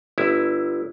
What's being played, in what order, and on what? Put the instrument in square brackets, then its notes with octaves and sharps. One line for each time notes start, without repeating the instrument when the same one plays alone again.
[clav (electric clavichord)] G1 E4